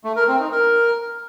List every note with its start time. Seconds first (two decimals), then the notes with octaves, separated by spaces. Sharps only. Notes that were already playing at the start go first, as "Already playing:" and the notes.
0.04 A3
0.16 A#4
0.28 C4
0.40 D#4
0.52 A#4